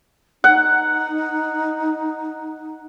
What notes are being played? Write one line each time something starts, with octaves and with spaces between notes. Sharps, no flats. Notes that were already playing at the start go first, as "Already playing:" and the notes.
D#4 F#5